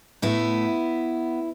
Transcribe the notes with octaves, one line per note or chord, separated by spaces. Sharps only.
A2 A3 B3 E4